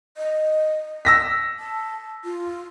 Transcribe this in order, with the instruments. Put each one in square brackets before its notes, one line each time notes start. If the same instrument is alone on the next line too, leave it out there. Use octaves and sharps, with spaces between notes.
[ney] D#5
[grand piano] E6 A#6 B6
[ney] A5
F4